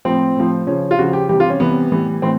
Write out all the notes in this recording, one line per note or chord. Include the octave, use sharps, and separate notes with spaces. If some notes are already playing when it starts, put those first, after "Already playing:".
A2 F3 C4
A2 F3
C#3 F3 C#4
F4
C#3 F3 F#4
G4
C3 E3 G3 G4
F4
C#4
C3 E3 G3 B3
A2 E3 G3
A2 E3 C4